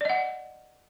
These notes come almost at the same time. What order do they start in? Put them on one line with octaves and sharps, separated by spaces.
D5 D#5 F#5